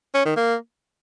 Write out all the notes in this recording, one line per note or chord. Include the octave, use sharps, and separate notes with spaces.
C#4
D#3
A#3